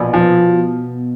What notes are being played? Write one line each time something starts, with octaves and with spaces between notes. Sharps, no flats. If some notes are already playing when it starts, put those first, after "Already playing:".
Already playing: A#1 B2
F3